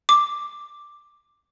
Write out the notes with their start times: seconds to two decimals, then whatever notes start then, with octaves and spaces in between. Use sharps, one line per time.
0.09 D6